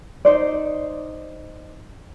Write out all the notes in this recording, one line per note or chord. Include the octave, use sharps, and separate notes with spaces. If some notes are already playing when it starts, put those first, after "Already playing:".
D#4 C5 D5